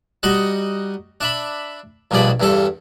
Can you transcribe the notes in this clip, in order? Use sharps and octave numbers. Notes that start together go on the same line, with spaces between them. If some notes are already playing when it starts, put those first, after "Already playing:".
G3 D#4 F#4 D#5 F#5
D4 E5 B5
A#1 G2 B2 G#4 D5 B5
E2 G2 G3 A4